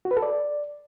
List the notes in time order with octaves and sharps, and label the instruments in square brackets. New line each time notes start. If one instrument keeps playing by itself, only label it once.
[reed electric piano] F#4
B4
A4
D5